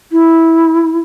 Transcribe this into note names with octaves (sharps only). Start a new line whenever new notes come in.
E4